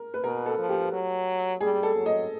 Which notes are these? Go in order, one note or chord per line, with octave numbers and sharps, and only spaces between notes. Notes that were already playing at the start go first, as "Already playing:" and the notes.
Already playing: A#4
B4
B2 A#4
A4
F3
G4
F#3
G3 G#4
A4
F#3
D#5